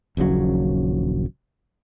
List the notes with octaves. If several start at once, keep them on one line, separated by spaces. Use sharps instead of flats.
D#1 A#1 C#3 F#3